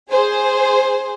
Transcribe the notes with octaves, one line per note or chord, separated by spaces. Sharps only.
G#4 C5